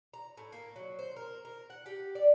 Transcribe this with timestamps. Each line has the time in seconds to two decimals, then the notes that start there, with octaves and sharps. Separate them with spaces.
0.14 A#5
0.37 A2
0.52 A#3
0.76 F#3
0.99 C5
1.16 A#4
1.45 A#4
1.70 F#5
1.86 G4
2.15 D5